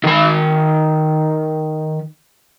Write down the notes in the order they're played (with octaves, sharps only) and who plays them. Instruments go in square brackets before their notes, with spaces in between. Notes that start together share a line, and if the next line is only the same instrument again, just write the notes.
[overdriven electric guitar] D#3 B5